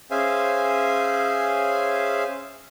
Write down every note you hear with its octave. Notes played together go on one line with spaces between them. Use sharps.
C#4 G#4 C5 E5 F5 G#5